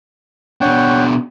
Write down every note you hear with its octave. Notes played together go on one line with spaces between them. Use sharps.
B2 D4 C#5 F#5 G5